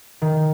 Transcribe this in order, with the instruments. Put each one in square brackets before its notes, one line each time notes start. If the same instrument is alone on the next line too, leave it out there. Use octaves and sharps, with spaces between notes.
[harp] D#3